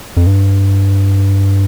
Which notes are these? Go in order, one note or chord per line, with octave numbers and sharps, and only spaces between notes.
F2
G2